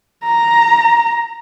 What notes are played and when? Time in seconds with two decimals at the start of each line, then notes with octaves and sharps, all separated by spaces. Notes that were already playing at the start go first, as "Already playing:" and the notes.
0.25 A#5